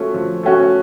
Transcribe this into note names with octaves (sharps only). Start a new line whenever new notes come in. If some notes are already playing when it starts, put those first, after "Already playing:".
Already playing: F3 A3 C#4 F#4
F3
A3 C#4 F#4